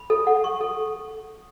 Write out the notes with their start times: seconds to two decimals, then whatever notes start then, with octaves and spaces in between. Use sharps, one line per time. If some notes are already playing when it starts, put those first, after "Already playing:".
Already playing: B5
0.10 A4
0.27 F#5
0.44 C#6
0.61 A4